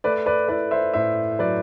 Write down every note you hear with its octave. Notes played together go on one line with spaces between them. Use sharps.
A3 B4 D5
B4 D5
E4 B4 D5
C5 E5
A2 C5 E5
F#3 B4 D5